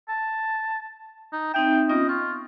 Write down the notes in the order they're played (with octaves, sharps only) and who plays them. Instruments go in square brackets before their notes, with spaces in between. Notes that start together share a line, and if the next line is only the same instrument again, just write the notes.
[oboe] A5
D#4
[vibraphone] C4 D#4 E5 [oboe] G5
[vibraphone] B3 C#4 F4 [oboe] D#5
[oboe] F4 [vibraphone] C#6